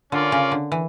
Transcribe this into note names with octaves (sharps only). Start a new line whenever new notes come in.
D3 C#4 F4 A#4 D5
C#3
D3
E3